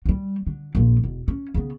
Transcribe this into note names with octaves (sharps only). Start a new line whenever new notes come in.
F#3 G3
D3
A#1 F3
E1
C#4
C#3 B3